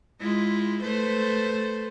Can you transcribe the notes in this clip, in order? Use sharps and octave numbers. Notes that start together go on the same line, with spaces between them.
G#3 E4 F4
A3 B4 C5